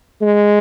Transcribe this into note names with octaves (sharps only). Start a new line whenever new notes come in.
G#3